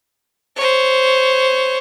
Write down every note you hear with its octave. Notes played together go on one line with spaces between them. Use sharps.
C5 C#5